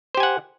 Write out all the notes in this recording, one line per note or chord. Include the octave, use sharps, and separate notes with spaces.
G4 C5 F#5 G#5